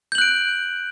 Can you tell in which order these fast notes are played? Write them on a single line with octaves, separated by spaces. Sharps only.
G6 F#7 F#6 D7